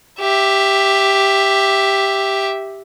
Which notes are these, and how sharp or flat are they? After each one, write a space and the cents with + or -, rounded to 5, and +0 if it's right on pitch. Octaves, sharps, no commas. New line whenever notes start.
G4 +0 E5 +0